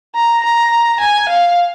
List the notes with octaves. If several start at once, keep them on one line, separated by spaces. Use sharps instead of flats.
A#5
A#5
G#5
F5